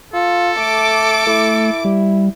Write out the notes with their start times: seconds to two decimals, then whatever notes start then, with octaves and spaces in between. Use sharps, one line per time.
0.14 F4 A4
0.58 A3 D6
1.27 A3 E4
1.85 G3